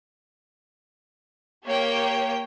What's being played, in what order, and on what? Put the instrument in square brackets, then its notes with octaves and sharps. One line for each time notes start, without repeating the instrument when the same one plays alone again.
[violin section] A#3 G4 C#5 G5